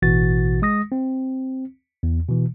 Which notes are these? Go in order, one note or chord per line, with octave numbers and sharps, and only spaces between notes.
A1 B2 E3 F#4 A6
G#3 D#6 A#6
C4
E2
B2 E3